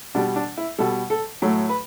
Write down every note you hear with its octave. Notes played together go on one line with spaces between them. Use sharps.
B2 G3 D4
D4
E4
B2 G3 A4
A4
A2 F#3 A3
B4